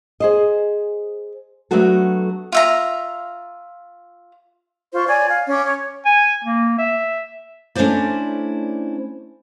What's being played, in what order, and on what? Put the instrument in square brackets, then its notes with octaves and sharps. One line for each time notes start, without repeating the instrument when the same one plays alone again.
[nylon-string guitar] G#4 C5 D#5
F#3 A3 B3 D4 F#4 A4
[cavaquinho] F4 E5 A#5
[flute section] F4 C5 C#6
C#5 D5 G#5
F5
C#4 D6
C#5
[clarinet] G#5
A#3
E5
[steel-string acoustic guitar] A3 C#4 D4 E4 C5 D5